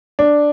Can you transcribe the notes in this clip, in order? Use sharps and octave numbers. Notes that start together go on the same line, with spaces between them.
D4